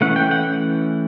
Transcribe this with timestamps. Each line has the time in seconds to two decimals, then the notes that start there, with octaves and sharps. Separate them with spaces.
0.01 E3 A3 C#4 F#5
0.16 G5
0.31 F#5